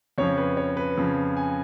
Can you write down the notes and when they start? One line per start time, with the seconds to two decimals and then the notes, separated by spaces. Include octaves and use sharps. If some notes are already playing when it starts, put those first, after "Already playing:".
0.18 F2 C#3 F3 C#5
0.38 B4
0.57 C#5
0.77 B4
0.97 F2 C#3 F3
1.37 G#5